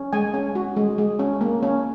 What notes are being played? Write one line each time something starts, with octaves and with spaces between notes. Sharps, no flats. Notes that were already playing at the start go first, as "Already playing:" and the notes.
Already playing: C#4
G#3 G#5
C#4
F#4
G#3
G#3
C#4
A#3
C#4